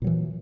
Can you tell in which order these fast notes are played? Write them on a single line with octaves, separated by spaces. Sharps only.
A#2 F#3 E3